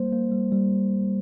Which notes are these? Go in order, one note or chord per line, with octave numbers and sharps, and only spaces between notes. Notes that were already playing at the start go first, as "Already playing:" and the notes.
Already playing: G3 A#3 C5
A#3
G3
G3